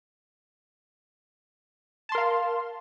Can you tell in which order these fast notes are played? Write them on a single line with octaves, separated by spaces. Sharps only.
A5 C6 A#4 F5